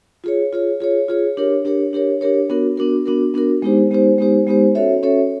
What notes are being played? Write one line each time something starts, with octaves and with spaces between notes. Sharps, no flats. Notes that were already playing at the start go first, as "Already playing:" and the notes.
F4 G#4 C#5
F4 G#4 C#5
F4 G#4 C#5
F4 G#4 C#5
D4 G4 A#4 C#5
D4 G4 A#4 C#5
D4 G4 A#4 C#5
D4 G4 A#4 C#5
B3 D4 F#4 A#4
B3 D4 F#4 A#4
B3 D4 F#4 A#4
B3 D4 F#4 A#4
G#3 B3 D#4 G4 C5
G#3 B3 D#4 G4 C5
G#3 B3 D#4 G4 C5
G#3 B3 D#4 G4 C5
C#4 F#4 A4 C#5 E5
C#4 F#4 A4 C#5 E5